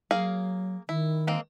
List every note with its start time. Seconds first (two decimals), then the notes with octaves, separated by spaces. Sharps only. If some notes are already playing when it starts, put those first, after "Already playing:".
0.11 F#3 A#3 G#4 F5
0.89 D#3 E4
1.27 G#3 A#3 C4